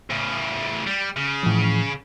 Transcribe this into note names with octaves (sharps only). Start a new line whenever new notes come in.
A2 C#3
G3
C#3
A2 E3 F3